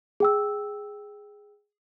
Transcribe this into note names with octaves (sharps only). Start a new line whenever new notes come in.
G#4 G5 E6